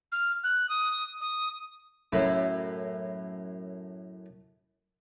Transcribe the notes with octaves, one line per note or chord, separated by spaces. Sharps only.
F6
F#6
D#6
D#6
F#2 A2 E4